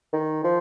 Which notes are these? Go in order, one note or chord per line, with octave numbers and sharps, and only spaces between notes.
D#3
F3